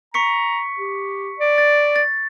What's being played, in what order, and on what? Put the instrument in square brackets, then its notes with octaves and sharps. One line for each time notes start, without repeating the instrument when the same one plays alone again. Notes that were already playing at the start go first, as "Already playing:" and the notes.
[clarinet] A#5 [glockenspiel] C#6 B6 C#7
[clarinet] G4
D5
[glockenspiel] A6
A6